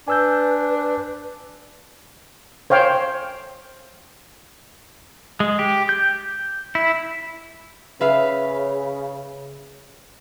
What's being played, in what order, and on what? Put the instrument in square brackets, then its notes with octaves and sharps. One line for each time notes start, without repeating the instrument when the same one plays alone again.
[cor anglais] D4 [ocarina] B4 [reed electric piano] G#5 E6 G6
[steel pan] C5 C#5 F5 G5
[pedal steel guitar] G#3
G4
G6
E4
[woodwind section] C#3 [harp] B4 E5 F5